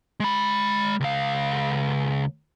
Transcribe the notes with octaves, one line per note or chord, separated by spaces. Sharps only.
G#3 B5
C#2 F5